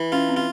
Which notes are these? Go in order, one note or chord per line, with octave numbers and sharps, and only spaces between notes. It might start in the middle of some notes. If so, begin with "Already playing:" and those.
Already playing: E3
C#4 F4
C4
F4